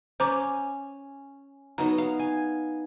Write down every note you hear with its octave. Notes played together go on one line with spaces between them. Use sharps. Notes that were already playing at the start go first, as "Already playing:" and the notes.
C#4 C5 A#5 D6
F#3 B3 D#4 A#5
F5
G#5